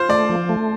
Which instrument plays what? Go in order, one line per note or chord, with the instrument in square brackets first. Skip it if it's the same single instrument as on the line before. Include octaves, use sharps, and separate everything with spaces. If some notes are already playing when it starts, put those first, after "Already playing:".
Already playing: [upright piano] F4 C5
[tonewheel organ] A3 [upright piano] D5
[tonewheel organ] F3
A3